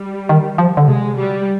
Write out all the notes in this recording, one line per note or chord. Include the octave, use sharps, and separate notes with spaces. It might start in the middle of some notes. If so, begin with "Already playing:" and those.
Already playing: G3
D#3
F3
D3
C3 G#3
G3